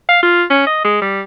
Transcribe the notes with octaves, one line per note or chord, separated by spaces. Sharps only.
F5
F4
C#4
D#5
G#3
G3